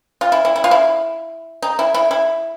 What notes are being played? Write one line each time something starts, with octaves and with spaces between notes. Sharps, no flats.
F4
E4
E4
E4
F4
E4
D#4
E4
E4
E4